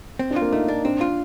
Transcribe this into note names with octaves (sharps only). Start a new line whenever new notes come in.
C4
D4
F4
A#3
A3 D#4
D4
C4 D4
F4